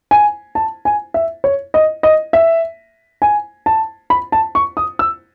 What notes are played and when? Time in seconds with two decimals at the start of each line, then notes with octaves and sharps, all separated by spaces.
0.11 G#5
0.55 A5
0.85 G#5
1.14 E5
1.44 C#5
1.74 D#5
2.03 D#5
2.33 E5
3.22 G#5
3.66 A5
4.10 B5
4.32 A5
4.55 C#6
4.77 D#6
4.99 E6